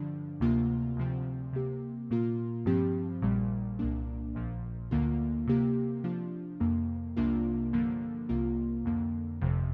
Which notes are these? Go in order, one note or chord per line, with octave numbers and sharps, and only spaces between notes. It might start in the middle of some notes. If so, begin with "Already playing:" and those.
Already playing: G2 D3 F3 D4
D2 C3 A#3 F4
D2 C3 F3 C4
C3 A#3 G4
A#2 A#3 F4
G2 F3 C4 G4
A#1 A#2 G3
C2 A#2 A#3 D4
A#1 A#2 F3
D2 D3 A#3 F4
C3 A#3 G4
C3 F3 D4 F4
F2 C3 A#3
C2 C3 A#3 D4 F4
G2 D3 F3 A#3
C2 C3 A#3 F4
F2 D3 A#3
G1 F2 C3 F3